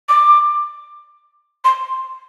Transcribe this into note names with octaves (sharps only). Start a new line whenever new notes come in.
D6
C6